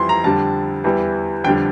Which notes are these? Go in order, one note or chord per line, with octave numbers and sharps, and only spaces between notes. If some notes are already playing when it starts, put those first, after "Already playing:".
Already playing: F2 E3 G3 C6
A#5
F2 D3 G3 A5
E2 E3 G3
F2 D3 G3 G5